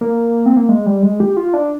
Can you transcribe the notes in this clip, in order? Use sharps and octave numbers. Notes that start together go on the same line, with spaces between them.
A#3
C4
A#3
G#3
G3
G#3
G4
F4
D4